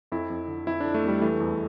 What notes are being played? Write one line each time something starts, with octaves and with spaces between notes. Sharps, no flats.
F2 E4
F2
D3
F2 E4
F2 D4
A3
F2 G3
E3 A3
E2